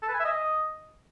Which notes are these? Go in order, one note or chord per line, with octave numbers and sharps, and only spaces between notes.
A4
B4
G#5
E5
D#5